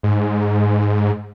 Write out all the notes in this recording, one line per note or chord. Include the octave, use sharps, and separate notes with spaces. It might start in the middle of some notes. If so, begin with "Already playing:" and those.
G#2